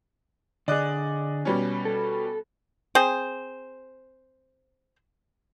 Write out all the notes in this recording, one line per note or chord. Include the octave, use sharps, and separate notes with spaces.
D3 G#4 D5 D#5 F#6
B2 G3 C#4
A4
C4 G#4 C5